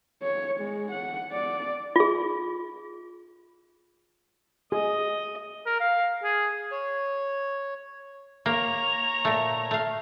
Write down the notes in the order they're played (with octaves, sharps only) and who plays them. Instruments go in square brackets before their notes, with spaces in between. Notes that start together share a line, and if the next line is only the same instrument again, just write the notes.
[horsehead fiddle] C#5
G#3
F#5
D5
[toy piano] F4 G#4
[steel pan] G#4 [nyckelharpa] D#5
[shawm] A#4
F5
G#4
[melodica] C#5
[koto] A#3 [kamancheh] C#5 A#5
[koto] A#2 A3
A3 F5